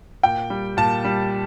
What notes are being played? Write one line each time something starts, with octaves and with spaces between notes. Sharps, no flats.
A#2 G5
G3
A#2 A5
G3